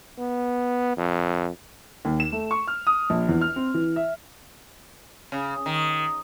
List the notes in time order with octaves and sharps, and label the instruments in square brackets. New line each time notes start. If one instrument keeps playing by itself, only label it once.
[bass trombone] B3
F2
[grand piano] D#2
E7
A3
C#6
F6
D#6
A#1
E2
F6
C4
E3
E5
[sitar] C#3
D#3